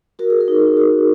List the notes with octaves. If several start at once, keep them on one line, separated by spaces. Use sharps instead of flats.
F#4 A#4
G#4
A#4
D#4
F#4